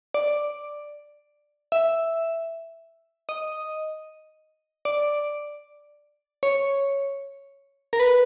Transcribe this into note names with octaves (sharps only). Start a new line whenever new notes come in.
D5
E5
D#5
D5
C#5
A#4
B4